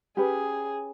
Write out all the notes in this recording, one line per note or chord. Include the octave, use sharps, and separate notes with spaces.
C#4 G4 G#4 B4